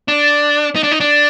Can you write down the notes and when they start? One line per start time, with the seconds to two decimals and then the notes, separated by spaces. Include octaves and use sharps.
0.08 D4
0.76 D#4
0.83 D4
0.91 D#4
1.00 D4